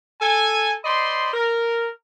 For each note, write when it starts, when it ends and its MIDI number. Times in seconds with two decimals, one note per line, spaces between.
0.21 0.75 69
0.21 0.75 80
0.85 1.33 72
0.85 1.33 74
0.85 1.33 75
0.85 1.33 83
0.85 1.33 84
1.33 1.89 70